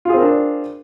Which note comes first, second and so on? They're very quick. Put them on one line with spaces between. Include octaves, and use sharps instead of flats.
F4 G#4 C4 A#4 D4